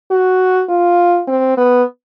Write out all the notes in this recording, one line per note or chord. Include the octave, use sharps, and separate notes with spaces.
F#4
F4
C4
B3